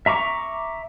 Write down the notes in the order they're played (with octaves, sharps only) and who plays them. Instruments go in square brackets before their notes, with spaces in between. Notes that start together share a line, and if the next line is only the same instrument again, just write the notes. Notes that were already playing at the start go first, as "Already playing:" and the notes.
[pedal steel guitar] E5 A#5 C#6 D6